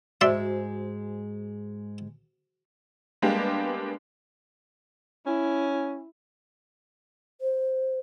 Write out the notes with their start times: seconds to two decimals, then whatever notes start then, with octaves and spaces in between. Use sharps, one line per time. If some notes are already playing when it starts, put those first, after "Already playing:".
0.21 G#2 G#3 F#4 C5 D5 E5 C6
3.22 G3 G#3 A#3 B3 D4 G4
5.26 C#4 E4
7.41 C5